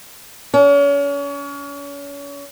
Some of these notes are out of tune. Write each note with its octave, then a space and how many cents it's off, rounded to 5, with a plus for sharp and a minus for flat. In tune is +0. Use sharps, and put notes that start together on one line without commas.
C#4 +35